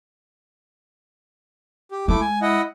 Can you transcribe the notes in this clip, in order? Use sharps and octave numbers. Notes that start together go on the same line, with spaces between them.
G4
G#3 A3 E4 D6
G#5
E4 D#5 F#5